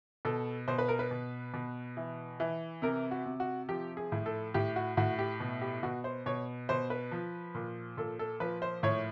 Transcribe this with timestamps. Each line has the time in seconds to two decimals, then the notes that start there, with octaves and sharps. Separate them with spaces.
0.25 B2 A4
0.68 B2 C5
0.78 B4
0.88 A#4
0.99 B4
1.11 B2
1.54 B2
1.97 E3
2.40 E3
2.82 C3 A#4
3.11 F#4
3.26 C3
3.40 F#4
3.69 F3 G4
3.97 G#4
4.12 A2
4.26 A4
4.54 A2 G4
4.76 F#4
4.97 A2 F#4
5.19 G4
5.40 B2
5.62 G4
5.83 B2 F#4
6.04 C5
6.26 B2 C#5
6.69 B2 C5
6.90 B4
7.12 F3
7.55 A#2
7.97 A#2 A4
8.19 A4
8.40 F3 B4
8.62 C5
8.83 A2 C#5